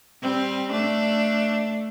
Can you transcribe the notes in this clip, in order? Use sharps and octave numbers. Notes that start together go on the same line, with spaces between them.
G3 C4
A3 D4